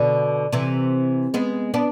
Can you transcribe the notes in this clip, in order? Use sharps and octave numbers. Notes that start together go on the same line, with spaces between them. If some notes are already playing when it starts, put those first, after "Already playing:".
Already playing: B2 D3
C3 E3
G#3 B3
B3 D4